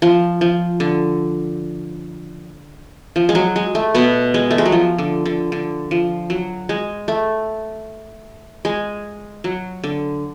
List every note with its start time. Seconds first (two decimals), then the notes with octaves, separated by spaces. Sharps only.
0.02 F3
0.41 F3
0.80 D3
3.16 F3
3.29 G#3
3.35 F#3
3.56 G#3
3.75 A3
3.95 B2 B3
4.34 G#3
4.51 A3
4.58 G#3
4.66 F#3
4.72 F3
4.98 D3
5.26 D3
5.52 D3
5.91 F3
6.30 F#3
6.69 G#3
7.08 A3
8.65 G#3
9.44 F#3
9.84 D3